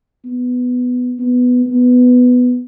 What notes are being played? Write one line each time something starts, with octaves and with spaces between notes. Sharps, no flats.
B3
B3
B3